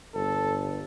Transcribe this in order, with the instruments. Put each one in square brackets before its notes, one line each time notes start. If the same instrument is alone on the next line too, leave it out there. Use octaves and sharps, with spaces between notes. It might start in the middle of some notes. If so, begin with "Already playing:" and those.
[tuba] G1 [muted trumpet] A4